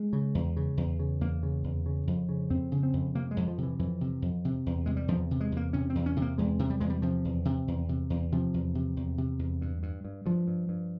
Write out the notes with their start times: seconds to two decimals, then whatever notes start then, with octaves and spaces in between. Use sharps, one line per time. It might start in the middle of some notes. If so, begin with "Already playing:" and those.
Already playing: G#3
0.13 C#3
0.35 E2
0.57 C#3
0.77 E2
0.99 C#3
1.21 E2 A#3
1.43 C#3
1.64 E2
1.86 C#3
2.07 F2
2.29 C#3
2.50 F2 C4
2.72 C#3
2.83 C4
2.93 F2
3.15 C3 A#3
3.31 G#3
3.37 F2
3.48 F3
3.58 C3 E3
3.79 F2 E3
4.01 C3
4.22 F2
4.45 C3
4.66 E2
4.86 C3 G#3
4.97 G3
5.08 E2 F3
5.31 C3
5.40 G#3
5.52 E2 A#3
5.73 C3 C#4
5.90 C4
5.95 E2
6.06 C#4
6.16 C3
6.22 A#3
6.38 E2 G#3
6.59 C3
6.70 G3
6.80 E2 G#3
6.90 G3
7.02 C3 F3
7.25 E2
7.45 C3
7.68 E2
7.89 C3
8.10 E2
8.32 C3 F3
8.54 E2
8.75 C3
8.97 E2
9.18 C3
9.39 E2
9.62 G2
9.83 G2
10.05 G2
10.26 G2 F3
10.48 G2
10.69 G2